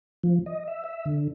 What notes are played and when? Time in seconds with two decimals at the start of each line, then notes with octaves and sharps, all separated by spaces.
0.23 F3
0.46 D#5
0.68 E5
0.84 E5
1.06 D3